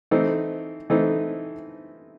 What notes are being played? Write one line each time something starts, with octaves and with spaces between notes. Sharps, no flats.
E3 A3 C4 D#4
E3 A3 C4 D#4